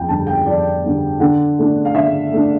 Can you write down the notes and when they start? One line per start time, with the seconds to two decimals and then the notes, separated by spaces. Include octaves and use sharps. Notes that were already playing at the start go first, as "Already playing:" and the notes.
Already playing: F2 G5
0.08 D3 G3 A5
0.27 G5
0.46 F2 D5
0.83 D3 G3
1.20 D3
1.58 A3 D4
1.85 F5
1.95 D3 E5
2.32 A3 D4